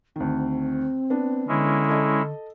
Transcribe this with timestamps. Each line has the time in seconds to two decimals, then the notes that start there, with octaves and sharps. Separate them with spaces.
0.16 D2 D#3 C4
1.10 B3 D4
1.48 D3 G#3 C#4 E4
1.89 A4 D#5